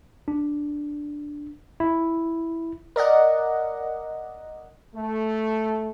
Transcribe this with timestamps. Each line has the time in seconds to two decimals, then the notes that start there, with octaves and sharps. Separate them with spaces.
0.28 D4
1.80 E4
2.96 A#4 D5 D#5 F#5
4.95 A3